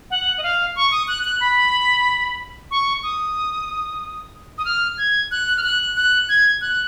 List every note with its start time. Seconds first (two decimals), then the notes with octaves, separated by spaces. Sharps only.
0.11 F#5
0.38 D#5
0.43 F5
0.76 C#6
0.92 D#6
1.08 F#6
1.24 F#6
1.41 B5
2.71 C#6
3.03 D#6
4.58 D#6
4.65 F6
4.98 G#6
5.31 F#6
5.57 F6
5.63 F#6
5.96 F#6
6.29 G#6
6.61 F#6